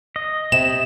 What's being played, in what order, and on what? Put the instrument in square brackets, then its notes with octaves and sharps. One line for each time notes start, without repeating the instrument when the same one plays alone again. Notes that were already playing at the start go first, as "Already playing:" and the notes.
[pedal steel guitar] D#5
[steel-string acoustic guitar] C3 [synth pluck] E7